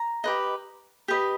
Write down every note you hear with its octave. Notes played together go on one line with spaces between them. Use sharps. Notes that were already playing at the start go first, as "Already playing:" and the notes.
Already playing: A#5
G4 B4 D#5
G4 B4 D#5